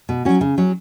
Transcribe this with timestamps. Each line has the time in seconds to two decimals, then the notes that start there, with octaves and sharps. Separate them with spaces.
0.09 B2
0.25 F#3 C#4 F#4
0.41 C#3
0.58 F#3 C#4